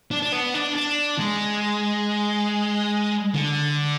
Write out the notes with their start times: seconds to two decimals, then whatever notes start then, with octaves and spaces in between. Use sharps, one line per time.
0.11 D4
0.22 D4
0.32 B3
0.54 D4
0.75 D4
1.19 G#3
3.35 D3